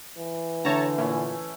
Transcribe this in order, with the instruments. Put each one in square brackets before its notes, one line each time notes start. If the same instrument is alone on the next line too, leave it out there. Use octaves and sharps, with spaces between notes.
[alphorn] E3
[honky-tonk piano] D3 [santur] A3 [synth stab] C#5 A5 A#5
[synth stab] A#2 [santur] C#4 E4